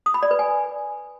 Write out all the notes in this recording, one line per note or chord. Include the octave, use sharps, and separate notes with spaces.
D#6
B5
D5
B4
G#5